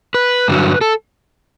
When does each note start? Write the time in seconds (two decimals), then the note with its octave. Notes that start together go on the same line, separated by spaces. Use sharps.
0.14 B4
0.48 G2 D3 F#3
0.81 A4